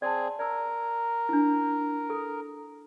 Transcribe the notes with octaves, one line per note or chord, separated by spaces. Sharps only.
C4 G#4 D5 A5
A#4 D5 E6
D4 E4
A4 D#6